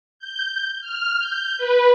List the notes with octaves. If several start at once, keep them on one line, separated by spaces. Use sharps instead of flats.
G6
F6
G6
B4